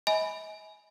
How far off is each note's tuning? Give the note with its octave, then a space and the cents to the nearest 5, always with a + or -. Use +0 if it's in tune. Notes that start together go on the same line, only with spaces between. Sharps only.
D#5 +40 G#5 +15 B5 +0